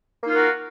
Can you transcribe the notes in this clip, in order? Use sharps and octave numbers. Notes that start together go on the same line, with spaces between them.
A#3 D#4 F4 F#4 A#4